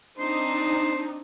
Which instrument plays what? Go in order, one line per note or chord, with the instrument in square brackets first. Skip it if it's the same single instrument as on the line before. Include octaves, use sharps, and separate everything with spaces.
[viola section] C4 D4 D#4 [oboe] C5